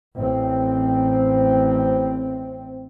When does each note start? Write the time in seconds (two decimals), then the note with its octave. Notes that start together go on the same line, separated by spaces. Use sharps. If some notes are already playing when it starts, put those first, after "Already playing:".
0.16 A1 C4